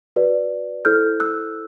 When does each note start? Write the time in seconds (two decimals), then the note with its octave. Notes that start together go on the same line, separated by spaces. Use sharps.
0.16 F#4 B4 D5
0.85 E4 A4 C5 F6 G6
1.20 E6 F#6